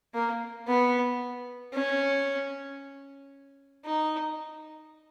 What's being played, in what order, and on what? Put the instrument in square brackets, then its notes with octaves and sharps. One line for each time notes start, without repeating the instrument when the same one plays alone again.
[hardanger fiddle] A#3
B3
C#4
D#4